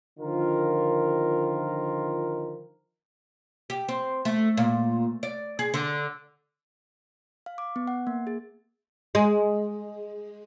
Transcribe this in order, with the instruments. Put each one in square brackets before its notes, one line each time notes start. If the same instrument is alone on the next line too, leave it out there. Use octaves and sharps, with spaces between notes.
[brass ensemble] D3 D#3 F3 F4 A#4
[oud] G4
C4
A3
A#2
D5
G#4
D3
[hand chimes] F5
D6
B3
F#5
A#3
G#4
[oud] G#3